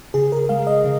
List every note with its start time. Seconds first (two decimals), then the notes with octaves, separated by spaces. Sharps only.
0.14 C#3 G#4
0.32 A#4
0.49 G#3 F5
0.67 D#5
0.84 C#3